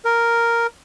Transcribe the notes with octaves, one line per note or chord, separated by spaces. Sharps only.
A#4